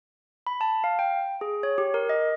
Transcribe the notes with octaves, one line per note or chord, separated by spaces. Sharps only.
B5
A5
F5
G5
G#4
C#5
G4
A#4
D#5